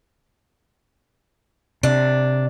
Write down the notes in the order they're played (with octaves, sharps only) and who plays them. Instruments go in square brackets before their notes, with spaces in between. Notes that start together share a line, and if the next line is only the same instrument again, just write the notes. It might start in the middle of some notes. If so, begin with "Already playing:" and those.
[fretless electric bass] C3 [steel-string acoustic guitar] D4